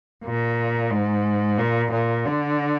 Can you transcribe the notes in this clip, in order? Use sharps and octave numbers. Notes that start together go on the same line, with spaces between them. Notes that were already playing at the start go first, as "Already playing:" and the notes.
A#2
G#2
A#2
A#2
D3